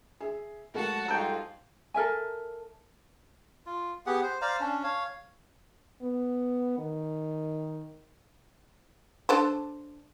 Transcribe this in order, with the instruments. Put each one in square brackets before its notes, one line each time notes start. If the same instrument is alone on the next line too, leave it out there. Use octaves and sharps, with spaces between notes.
[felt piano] G#4 E5
[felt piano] G#3 A3 A#4 [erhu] F#4 [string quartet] F#5 A5
[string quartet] G#2 G3 F4 [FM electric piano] A4 G5 [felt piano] A#5
[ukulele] A4 A#4 E5 G#5
[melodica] F4
B3 G4 G#4 F#5
C5
C5 D5 F5 A#5
C#4 D4
C#5 F5
[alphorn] B3
D#3
[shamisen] D4 A4 C5